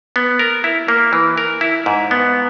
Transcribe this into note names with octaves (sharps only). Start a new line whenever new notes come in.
B3
A#4
E4
A#3
E3
A#4
E4
G#2
B3